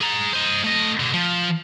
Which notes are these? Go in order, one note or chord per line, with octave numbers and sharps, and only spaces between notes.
G#4 A#5
C5 D#5
A3 D#5
B2 D3
F3